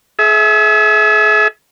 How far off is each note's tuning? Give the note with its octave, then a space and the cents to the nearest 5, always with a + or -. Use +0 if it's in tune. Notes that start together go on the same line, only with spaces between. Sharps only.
G#4 +40 E5 -10